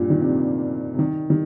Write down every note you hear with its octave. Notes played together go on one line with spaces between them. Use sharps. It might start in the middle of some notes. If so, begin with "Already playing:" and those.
Already playing: G2 A#2
D#3
C3
C3
D#3
D#3